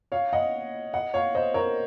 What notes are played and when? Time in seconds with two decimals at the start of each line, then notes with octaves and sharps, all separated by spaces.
0.12 C#5 F5
0.33 D#5 F#5
0.93 D#5 F#5
1.14 C#5 F5
1.35 C5 D#5
1.54 A#4 C#5